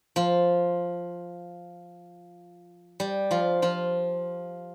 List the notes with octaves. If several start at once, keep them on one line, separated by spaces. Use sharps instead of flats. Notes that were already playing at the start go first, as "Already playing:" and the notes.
F3 F4
G3 G4
F3 F4
F3 F4